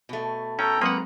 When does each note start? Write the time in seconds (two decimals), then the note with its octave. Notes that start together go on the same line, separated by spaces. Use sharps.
0.09 B2 A3
0.59 C#4 A4 G5 A#5
0.81 F#3 G#3 A#3 C4 B4 F#5 A#5